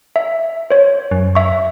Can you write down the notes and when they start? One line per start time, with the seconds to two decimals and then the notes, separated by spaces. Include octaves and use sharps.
0.16 E5
0.70 C5 C#5
1.11 F#2
1.35 E5 C#6